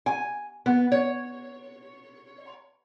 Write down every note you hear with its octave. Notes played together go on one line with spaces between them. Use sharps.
G#5
B3
C#5